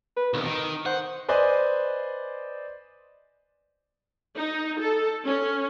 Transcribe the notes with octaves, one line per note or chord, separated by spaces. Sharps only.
B4
B1 F2 D#3
D#3 D#4
C5 F#5
B4 C5 D5 D#5 G#5 C6
D#4
A4
C#4